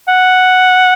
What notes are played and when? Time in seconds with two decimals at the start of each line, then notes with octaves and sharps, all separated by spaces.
0.08 F#5